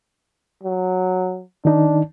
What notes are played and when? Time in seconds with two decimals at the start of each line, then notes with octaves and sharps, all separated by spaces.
0.63 F#3
1.65 D#3 D4 D#4